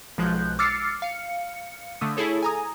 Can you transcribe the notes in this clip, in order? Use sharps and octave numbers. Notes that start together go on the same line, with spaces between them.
B1 F3 G#3 F#6 G6
D6 E6 F6 A6 C7 C#7
F5 C#7
D3 A3 D#6
E4 G#4 A4 C#5
G#5 A#5 D#6